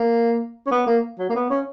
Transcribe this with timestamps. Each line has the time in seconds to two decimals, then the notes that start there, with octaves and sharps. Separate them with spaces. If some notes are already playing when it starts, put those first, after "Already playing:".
Already playing: A#3
0.66 C#4
0.71 B3
0.87 A#3
1.19 F#3
1.30 A#3
1.35 B3
1.50 C#4